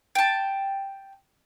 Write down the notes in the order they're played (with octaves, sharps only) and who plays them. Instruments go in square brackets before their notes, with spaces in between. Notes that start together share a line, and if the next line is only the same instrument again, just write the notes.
[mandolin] G5 A5